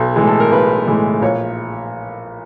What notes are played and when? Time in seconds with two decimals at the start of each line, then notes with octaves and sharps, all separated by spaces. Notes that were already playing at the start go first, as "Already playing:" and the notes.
Already playing: B1 A4
0.16 A2 E3 G#3
0.27 A4
0.40 A#4
0.52 B1 B4
0.87 A2 E3 G#3
1.21 A#1 C#5